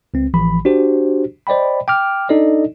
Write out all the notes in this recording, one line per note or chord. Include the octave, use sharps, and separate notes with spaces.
C#2 C4
A1 E3 F3 B5
D4 F#4 G4 C5
C5 D5 D#5 G5 B5
G5 D6 F6
D4 D#4 A4 D5 D#5